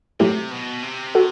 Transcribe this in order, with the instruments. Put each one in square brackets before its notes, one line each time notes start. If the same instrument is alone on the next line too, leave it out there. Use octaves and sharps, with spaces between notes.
[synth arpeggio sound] A2 F#3 A3 E4 G4 [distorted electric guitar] C3
[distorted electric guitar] B2
C3
[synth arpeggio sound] F#4 A4